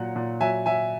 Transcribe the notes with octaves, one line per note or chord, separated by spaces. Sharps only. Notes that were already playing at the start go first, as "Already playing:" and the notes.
Already playing: A#2 F#3 F#5
A#2
F#3 E5 G#5
F#3 E5 G#5